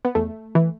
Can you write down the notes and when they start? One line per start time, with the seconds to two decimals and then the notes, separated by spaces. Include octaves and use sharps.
0.05 B3
0.15 E2 A3
0.55 E3